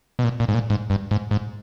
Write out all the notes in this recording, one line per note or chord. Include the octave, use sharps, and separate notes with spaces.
B2
A#2
A#2
G#2
A#2
G#2
G2
G#2
G#2